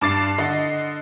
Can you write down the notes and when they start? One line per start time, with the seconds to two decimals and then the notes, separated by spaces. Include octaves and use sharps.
0.01 G2 D6 A6 C7
0.38 D3 D#5 C7